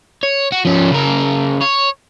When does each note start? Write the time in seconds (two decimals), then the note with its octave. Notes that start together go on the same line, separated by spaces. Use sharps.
0.23 C#5
0.52 F#4
0.65 F3 C#4
0.92 C#3 A#4
1.61 C#5